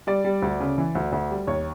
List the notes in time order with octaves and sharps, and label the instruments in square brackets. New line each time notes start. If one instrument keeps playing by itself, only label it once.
[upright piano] G3 D5
G3
D2
C#3
E3
D2
D2
G3
D#2 C#5